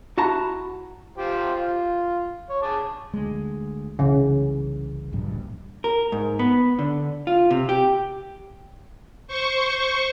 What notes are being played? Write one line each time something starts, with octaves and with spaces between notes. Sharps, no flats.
E4 F#4 A5 A#5
F4 G4 C5
F4
C#5
G#4 A5 D6
D2 G#3
C2 C#3 E3
D1 A#1 G2
A#4
G#2
B3
D3
F4
C3
G4
C5 C#6